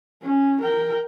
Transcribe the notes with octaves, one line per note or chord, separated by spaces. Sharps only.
C#4
A#4 G5